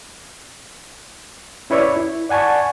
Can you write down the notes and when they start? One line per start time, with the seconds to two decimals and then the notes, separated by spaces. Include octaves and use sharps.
1.70 C#4 E4 B4 C#5 D5 E5
1.96 E4
2.29 D5 F#5 G#5 A5 C#6